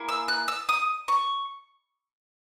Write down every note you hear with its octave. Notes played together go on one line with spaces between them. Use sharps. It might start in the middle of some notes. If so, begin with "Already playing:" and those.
Already playing: A#3 E4 G#4
E6
F#6
E6
D#6
C#6